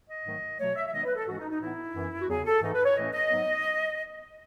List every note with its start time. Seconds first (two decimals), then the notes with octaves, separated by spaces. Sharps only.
0.09 D#5
0.25 G#2 D#3 F#3 A3
0.59 B2 F#3 A3 C#5
0.76 E5
0.87 E5
0.93 D#3 G#3 B3 D#4 D#5
1.04 B4
1.15 A4
1.27 G#2 E3 G#3 C#4 F#4
1.39 D#4
1.50 D#4
1.61 A2 E3 B3 D#4 E4
1.95 F#2 E3 B3
2.21 F#4
2.28 E2 C#3 F#3 G#4
2.45 A4
2.62 G#2 E3 A3 D#4
2.74 B4
2.85 C#5
2.96 A2 E3 A3 C#4 D#5
3.13 D#5
3.30 G#2 F#3 B3